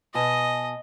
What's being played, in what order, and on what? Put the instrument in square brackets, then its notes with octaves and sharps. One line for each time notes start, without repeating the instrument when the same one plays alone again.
[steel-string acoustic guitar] B2 G#5 A5 [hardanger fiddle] D#5